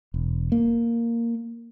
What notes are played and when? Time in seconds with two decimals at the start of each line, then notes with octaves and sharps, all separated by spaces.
0.14 E1
0.52 A#3